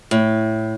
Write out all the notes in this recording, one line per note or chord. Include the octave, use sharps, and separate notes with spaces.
A2